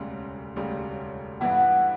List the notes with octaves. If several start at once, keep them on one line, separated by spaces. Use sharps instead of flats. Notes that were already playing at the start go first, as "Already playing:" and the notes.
Already playing: E1 D2 C#3 G3 C#4
E1 D2 C#3 G3 C#4
G2 E3 B3 E4 F#5